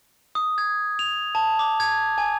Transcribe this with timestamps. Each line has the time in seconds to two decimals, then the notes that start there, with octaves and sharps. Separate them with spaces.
0.35 D#6
0.58 G#6
0.99 F7
1.35 A5
1.59 D6
1.80 G#6
2.18 G#5